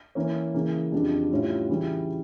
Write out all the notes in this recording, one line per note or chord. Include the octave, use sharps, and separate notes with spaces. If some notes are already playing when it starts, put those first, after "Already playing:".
E3 A#3 C#4
C#3 E3 A#3
F2 C#3 G3 D4
A2 G3 C#4 F4
C#3 E3 G3